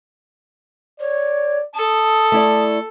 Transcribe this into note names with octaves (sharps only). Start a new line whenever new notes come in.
C#5 D5
A4 A5 D#6
A3 E4 D5